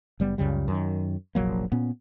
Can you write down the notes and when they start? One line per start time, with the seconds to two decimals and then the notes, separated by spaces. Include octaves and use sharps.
0.20 F#1 G3 B3
0.38 C#2 F#2 C#3 G3
0.68 F#2 D#3
1.35 F1 A#1 F#3 A#3
1.72 A#2 B3 C#4